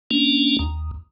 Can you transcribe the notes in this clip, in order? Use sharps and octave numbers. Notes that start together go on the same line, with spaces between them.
A#3 C#4 D4
D#2